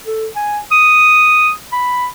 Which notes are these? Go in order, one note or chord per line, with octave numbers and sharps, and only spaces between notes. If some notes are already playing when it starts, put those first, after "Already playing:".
A4
G#5
D#6
B5